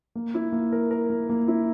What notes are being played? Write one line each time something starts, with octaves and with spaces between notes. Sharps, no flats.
A#3
E4
A#3
A#4
A#4
A#3
A#3
E4